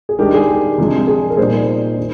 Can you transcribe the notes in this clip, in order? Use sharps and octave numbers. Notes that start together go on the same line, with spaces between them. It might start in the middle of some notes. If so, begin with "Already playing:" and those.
G#4
D#3 G#3 D4 G4 A#4
G#4
G4
C3 F3 G#3 D4
G#4
A#4
A#2 G3 A#3 D#4 G#4 C5
D#3